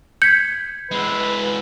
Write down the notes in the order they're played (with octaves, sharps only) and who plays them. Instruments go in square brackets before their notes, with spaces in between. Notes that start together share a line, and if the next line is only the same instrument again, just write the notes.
[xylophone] G6 [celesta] G#6 B6 C#7
[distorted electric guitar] G#3 E4 [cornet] B4